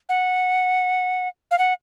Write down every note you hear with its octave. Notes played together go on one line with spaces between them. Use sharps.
F#5
F5
F#5